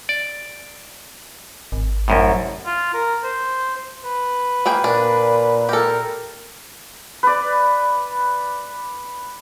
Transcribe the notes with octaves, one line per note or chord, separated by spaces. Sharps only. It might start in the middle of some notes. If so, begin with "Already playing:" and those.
D5
G#1
C2 F#2 A2
F4
A#4
C5
B4
A#3 G#4 G5
A#2 D4
G4 A4 A#4
B4 D5